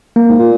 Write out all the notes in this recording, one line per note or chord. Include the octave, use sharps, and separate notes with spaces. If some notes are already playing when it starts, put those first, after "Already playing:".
A#3
G#2
A#2